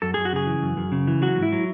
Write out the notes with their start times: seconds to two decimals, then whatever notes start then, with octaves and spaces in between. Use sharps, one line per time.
0.02 F#2 A4
0.14 F#2 G#4
0.25 F#4
0.33 C#3 G#4
0.47 E3
0.62 F#2
0.77 F#2
0.92 C#3
1.07 E3
1.22 F#3 F#4
1.38 G#2 E4
1.52 F#3